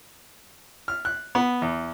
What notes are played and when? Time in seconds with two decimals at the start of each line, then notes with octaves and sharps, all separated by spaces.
0.88 F6
1.05 F#6
1.35 B3
1.62 E2